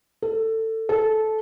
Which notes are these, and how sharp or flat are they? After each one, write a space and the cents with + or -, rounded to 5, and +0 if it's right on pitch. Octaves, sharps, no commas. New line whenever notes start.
A4 +20
A4 -15